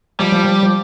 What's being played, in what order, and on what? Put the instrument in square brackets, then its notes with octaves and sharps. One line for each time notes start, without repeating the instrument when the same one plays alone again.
[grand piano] F3 [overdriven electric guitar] G3
[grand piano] F3
F3
F3